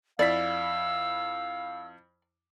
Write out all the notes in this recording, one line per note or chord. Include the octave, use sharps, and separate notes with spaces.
F2 E4 D5 F5 E6 B6